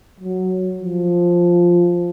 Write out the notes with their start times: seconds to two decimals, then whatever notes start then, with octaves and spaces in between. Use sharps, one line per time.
0.20 F#3
0.78 F3